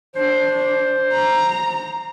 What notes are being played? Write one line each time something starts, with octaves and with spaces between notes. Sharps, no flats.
D4 C5
A#5